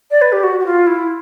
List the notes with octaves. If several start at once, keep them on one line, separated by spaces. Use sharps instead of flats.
D5
B4
G4
F#4
F#4
F4
E4